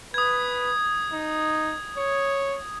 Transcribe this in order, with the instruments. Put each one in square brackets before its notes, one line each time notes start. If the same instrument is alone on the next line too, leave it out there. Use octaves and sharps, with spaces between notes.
[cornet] B4 [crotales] D#6 G#6
[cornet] D#4
C#5